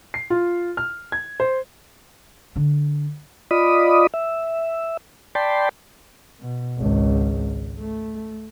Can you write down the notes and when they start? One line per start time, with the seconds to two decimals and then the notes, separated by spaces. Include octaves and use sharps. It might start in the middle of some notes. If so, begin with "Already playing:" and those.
0.14 C7
0.30 F4
0.77 F6
1.12 G#6
1.40 C5
2.56 D3 D4
3.51 F4 D5 D#5 B5 D#6
4.14 E5
5.35 D5 G5 A5 B5 C6
6.41 B2
6.78 G#1 C#2
7.79 A3